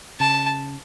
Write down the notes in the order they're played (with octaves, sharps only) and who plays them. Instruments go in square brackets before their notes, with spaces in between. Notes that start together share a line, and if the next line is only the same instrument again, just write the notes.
[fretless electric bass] C#3 [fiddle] A5